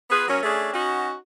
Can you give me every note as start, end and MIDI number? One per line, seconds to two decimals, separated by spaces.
0.10 0.25 59
0.10 0.25 65
0.10 0.25 68
0.10 0.25 71
0.28 0.40 54
0.28 0.40 58
0.28 0.40 61
0.43 0.71 57
0.43 0.71 61
0.43 0.71 62
0.43 0.71 68
0.74 1.14 61
0.74 1.14 63
0.74 1.14 66